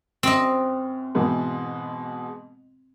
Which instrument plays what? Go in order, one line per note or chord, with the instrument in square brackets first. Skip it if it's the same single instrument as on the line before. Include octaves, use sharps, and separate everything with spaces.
[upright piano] F#2 [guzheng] C4 D#5
[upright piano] G#2 B2 E3